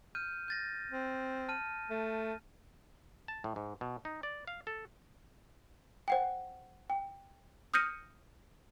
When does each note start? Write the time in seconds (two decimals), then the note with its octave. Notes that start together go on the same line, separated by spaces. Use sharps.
0.15 F6 G6 D#7
0.48 G6 A6 A#6
0.91 C4
1.49 A5 F6 D#7
1.90 A3
3.28 A5
3.44 A2
3.56 G#2
3.81 B2
4.05 D#4
4.23 D5
4.47 F5
4.67 A4
6.08 C5 F#5 G5
6.90 G5
7.74 D#6 F6 G6 A#6 C#7 D#7